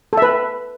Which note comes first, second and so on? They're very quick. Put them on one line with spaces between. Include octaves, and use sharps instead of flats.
A4 E5 B4